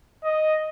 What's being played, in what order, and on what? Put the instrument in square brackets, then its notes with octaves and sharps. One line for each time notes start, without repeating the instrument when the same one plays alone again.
[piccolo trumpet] D#5